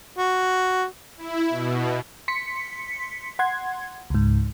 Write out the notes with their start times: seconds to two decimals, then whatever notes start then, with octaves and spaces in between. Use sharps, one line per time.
0.18 F#4
1.17 E4
1.49 B2
2.28 C6 B6 C#7
3.39 F#5 C6 G#6
4.10 C#2 G#2